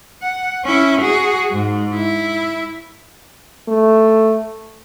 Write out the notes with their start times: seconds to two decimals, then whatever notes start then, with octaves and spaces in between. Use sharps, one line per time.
0.22 F#5
0.65 C#4 E4
1.01 F#4 G#4
1.51 G#2
1.94 E4
3.68 A3